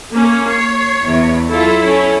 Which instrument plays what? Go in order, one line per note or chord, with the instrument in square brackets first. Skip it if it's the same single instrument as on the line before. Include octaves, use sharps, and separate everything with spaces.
[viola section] A#3 C#4
[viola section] C#5 [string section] C7
[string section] E2
[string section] F#3 F4 [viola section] E4 A4
[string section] C#4